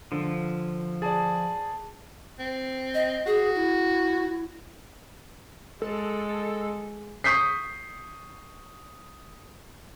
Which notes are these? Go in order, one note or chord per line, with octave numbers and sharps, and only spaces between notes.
D3 F3
G#4 D5 A5 A6
C4
D#5
F#4 G#4
E4
G#3 A4
C#6 D#6 G6 B6 C7